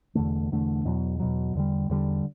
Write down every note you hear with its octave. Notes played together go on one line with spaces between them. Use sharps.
E1 E2 D3 A3
E1 E2 D3 A3
E2 B2 F#3
E2 B2 F#3
E2 D3 G3
E2 D3 G3